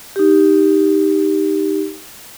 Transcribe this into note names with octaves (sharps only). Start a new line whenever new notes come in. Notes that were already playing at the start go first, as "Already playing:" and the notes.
D#4 G4